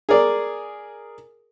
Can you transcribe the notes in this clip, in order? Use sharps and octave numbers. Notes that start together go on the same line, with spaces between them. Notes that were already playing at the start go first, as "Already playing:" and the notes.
G#4 A#4 D5